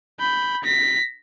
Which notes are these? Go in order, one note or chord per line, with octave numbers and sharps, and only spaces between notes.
B5 G6
A#6 B6